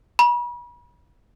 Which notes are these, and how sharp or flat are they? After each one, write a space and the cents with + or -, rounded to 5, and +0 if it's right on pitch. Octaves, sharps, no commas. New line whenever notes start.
B5 -40